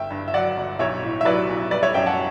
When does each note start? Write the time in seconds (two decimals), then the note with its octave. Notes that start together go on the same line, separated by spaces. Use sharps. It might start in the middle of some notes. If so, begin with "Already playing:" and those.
Already playing: G1 E5 G5
0.10 G2
0.28 E5
0.34 F#3 D5 F#5
0.57 G1
0.79 B1 C#5 E5
1.03 A2
1.21 E5
1.25 F#3 B4 D5
1.49 B1
1.71 G3 B4 D5
1.83 C#5 E5
1.94 F#2 E5 G5
2.06 F#5 A5